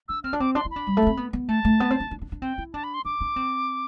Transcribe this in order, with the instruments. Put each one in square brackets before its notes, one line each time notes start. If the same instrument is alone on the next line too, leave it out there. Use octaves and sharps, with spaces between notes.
[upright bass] D4 [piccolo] E6
[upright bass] C4 [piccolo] F6
[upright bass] D4
[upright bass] C4 [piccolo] D6
[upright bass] D4 [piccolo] C6
[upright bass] E4
[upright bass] D4 [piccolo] B5
[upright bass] G3
A3
D4
C4
B3
B3
[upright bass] A3 [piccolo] A5
[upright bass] A3
B3
C4
D4
D4
D4
D4
[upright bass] C4 [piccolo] G5
[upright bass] E4
[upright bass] D4 [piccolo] A5
[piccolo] B5
C6
[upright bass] D4 [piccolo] D6
[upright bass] D4
C4